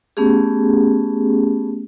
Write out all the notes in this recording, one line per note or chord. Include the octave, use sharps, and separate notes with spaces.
A3 B3 C#4 G4 G#4